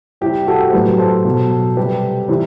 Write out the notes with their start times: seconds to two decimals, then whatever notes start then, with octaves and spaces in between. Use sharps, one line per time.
0.21 C3 G3 E4 G4
0.47 F#4 A4
0.70 C5
0.73 A2 F#3 G4 B4
0.99 A4 C5
1.25 B2 F#3
1.76 C3 G3 G4 B4
2.28 C3 E3 G3